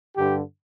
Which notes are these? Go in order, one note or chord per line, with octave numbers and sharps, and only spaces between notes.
G2 D3 G4